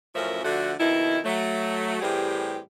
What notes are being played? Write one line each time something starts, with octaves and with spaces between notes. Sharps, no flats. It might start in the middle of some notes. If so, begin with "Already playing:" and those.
F#2 A2 F3 C#4 A#4 E5
D3 F3 A3 D4 F#4
F2 B2 D#3 D#4 E4
F#3 A3
A2 E3 G3 C4 G4 G#4